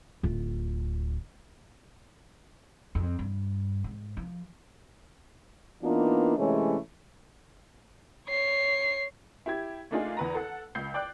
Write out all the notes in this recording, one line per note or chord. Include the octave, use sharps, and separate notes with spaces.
D1 F4
F2
G2
G#2
F3
E3 A#3 B3 D4 D#4 F4
C3 E3 G#3 A3 C#4
C#5 C7
E4 G4 G#6
A3 A#3 D4 D#4 F4 G#4
E2 B4 A#5
A4 F#5
C#2 G6 C7
D5 G5 D6 F#6